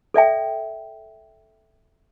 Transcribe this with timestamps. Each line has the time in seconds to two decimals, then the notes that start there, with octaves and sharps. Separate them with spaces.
0.14 A4 D5 E5 G5